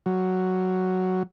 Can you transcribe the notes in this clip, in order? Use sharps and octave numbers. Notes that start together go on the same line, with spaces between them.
F#3